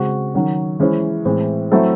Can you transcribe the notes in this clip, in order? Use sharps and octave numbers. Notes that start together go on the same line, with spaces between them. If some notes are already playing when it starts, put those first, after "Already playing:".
Already playing: C#3 G#3 C4 F#4
D#3 F#3 C#4 F#4
E3 G#3 C#4 E4 C5
A2 E3 G#3 C4
F#3 A3 C4 E4 A4